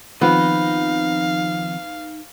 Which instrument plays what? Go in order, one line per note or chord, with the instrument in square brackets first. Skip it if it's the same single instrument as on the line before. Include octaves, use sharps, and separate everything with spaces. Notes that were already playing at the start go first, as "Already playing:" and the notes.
[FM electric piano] D#3 F3 C4 [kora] B3 [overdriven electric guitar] D#4 A#5 [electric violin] F5